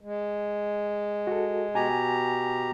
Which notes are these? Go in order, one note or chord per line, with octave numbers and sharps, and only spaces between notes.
G#3
F#4 A4
B2 G4 G#5 A#5